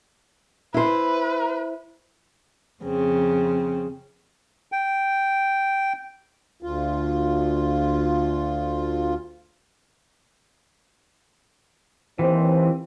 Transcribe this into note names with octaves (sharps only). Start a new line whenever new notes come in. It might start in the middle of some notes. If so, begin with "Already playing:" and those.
E4 B4 C5
F2 C#3 C4
G5
D2 F4
D#2 E3 C4 C5